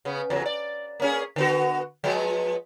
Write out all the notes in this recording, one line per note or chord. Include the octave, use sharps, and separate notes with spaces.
C#3 B3
E2 C#3 F#3
D5
A#3 C#4 G#4
D3 B3 F#4
F3 G#3 B3